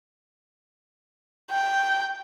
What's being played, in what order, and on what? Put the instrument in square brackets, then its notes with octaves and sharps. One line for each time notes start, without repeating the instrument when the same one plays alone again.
[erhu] G5